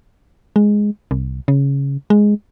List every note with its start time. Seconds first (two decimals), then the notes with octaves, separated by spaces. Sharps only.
0.56 G#3
1.11 C2
1.48 C#3
2.10 G#3